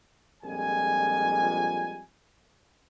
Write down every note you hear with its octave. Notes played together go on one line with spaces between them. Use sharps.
A#1 F2 G3 G#3 G#5